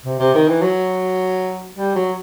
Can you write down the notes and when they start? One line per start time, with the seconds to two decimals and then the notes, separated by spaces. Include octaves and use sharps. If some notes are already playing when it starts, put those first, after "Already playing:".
0.05 C3
0.20 C3
0.34 D#3
0.48 E3
0.62 F#3
1.76 G3
1.95 F#3